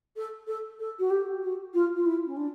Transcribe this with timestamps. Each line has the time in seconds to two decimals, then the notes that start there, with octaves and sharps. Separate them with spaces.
0.16 A4
0.47 A4
0.80 A4
0.99 F#4
1.10 G4
1.43 F#4
1.74 F4
1.96 F4
2.06 E4
2.26 C#4
2.37 D4